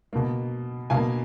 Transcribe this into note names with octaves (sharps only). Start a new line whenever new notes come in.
B2 A#3
B2 A#3 F5 G#5